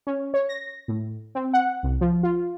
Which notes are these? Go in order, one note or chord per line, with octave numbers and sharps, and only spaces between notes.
C#4
C#5
A#6
A2
C4
F#5
C2
F3
F4